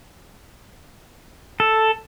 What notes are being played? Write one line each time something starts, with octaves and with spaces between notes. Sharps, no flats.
A4